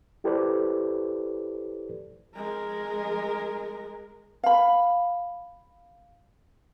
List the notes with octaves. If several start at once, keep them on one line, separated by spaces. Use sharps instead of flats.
E4 G4 A4 B4 C5 D5
G#3 A#4
F5 B5